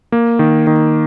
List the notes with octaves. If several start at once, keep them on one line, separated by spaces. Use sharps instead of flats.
A#3
D#3
D#3